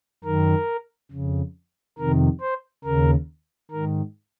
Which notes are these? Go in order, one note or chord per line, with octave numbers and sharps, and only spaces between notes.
F#2 D#3 A#4
F2 C#3
F2 C3 D#3 A#4
C5
D#2 C#3 A#4
G#2 D#3 A#4